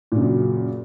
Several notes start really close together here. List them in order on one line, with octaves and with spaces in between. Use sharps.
A#2 C#3 F#2